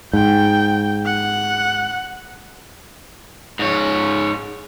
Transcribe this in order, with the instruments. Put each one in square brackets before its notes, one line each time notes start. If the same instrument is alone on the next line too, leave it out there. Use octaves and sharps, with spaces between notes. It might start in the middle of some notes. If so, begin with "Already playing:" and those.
[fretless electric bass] G#2 [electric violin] G5
[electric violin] F#5
[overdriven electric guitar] G#2 C#5